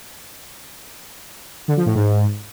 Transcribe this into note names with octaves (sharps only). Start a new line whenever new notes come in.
D3
F3
A2
G#2